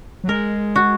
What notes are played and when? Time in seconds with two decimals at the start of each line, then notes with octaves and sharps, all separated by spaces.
0.24 F#3
0.28 G#3 A#4
0.76 F#4